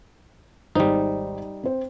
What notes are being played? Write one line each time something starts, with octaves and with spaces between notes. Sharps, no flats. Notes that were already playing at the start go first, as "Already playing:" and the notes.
G#1 G3 D#4 C5
C4 C5